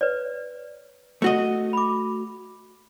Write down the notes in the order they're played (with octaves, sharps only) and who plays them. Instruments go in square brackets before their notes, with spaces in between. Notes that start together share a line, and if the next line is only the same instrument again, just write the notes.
[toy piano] B4 C#5 D5
[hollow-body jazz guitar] A3 F#4 D#5
[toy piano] B5 D6